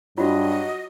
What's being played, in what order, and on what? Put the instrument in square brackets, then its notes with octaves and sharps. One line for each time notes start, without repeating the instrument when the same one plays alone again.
[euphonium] G2 [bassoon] F#3 [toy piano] F4 F#4 [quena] D#5